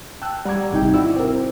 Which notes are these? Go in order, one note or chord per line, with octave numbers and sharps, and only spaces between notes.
G5 A5 E6 F#6
G3 F#5 A#5 C#6 D6 G#6
G#1 C3 D#4 G5
E4 F#4 D5 E6
C4 A#4